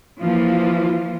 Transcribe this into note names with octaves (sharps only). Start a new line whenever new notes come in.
E3 F3 A#3 F4